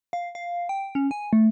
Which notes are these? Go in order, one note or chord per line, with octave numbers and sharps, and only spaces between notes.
F5
F5
G5
C#4
G#5
A3